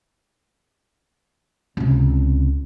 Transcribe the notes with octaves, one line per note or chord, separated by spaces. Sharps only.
C#2 C3